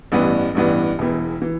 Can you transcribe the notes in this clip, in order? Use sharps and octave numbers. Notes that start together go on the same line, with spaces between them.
A1 G2 E3 B3 D4
A1 G2 E3 B3 D4
E1 E2 E3
E3